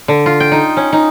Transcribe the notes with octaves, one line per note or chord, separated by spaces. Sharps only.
D3
F4
G5
D#4
C#4
D#4